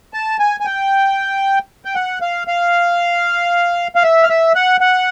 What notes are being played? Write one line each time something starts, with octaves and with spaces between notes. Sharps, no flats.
A5
G#5
G#5
G5
G5
F#5
F5
F5
F5
E5
F5
E5
F#5
F#5